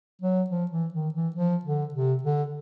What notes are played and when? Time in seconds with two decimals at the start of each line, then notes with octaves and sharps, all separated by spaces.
0.22 F#3
0.50 F3
0.71 E3
0.94 D#3
1.14 E3
1.36 F3
1.65 D3
1.94 C3
2.23 D3